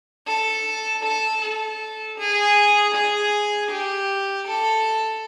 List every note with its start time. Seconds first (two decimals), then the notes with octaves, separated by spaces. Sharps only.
0.27 A4
1.03 A4
1.41 A4
2.18 G#4
2.94 G#4
3.71 G4
4.47 A4